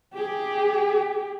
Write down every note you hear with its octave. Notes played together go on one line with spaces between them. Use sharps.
G4 G#4